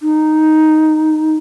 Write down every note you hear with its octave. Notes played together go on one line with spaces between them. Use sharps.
D#4